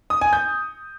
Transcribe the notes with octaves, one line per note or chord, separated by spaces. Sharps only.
D#6
G#5
G6